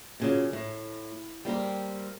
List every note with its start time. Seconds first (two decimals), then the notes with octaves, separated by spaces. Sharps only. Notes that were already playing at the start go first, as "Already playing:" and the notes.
0.20 A#2 C#3 F#3
0.53 A2
1.45 G3 A#3 C4 A#4